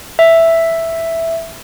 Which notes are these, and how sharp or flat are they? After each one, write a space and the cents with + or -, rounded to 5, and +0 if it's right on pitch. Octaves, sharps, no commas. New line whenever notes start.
E5 +0